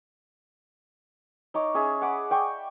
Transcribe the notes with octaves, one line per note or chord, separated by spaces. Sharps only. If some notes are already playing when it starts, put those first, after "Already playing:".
D#4 C#5 D6
C#4 G#4 E5
F#5 B5 D6
D5 G5 C#6